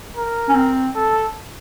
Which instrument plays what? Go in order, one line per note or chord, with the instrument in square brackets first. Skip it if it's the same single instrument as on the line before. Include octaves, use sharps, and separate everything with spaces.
[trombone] A#4
[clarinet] C#4
C4
[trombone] A4